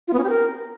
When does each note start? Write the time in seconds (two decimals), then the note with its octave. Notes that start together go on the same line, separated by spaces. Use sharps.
0.08 F4
0.13 B3
0.19 C#4
0.24 G4
0.29 A#4